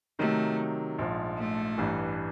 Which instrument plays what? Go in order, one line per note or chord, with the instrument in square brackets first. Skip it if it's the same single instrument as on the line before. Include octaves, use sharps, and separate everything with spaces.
[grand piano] C3 D#3 F#3 [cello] A3
[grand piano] A#1 G#2 F3
[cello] A3
[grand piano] A1 G2 E3